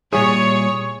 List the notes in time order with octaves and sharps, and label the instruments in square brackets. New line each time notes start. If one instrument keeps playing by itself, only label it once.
[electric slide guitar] A#2 G3 E4 [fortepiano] G#4 [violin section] C#5